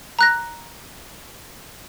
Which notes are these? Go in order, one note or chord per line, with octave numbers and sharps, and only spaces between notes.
A#5 F#6 A#6